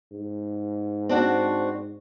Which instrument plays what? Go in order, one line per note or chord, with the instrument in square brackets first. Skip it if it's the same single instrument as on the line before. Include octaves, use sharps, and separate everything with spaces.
[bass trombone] G#2
[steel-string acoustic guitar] C4 D4 F#4